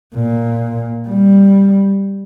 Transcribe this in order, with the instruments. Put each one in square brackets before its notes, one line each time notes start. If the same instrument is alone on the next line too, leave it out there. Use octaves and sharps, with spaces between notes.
[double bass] A#2
G3